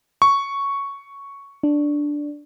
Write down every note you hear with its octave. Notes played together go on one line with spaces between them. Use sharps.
C#6
D4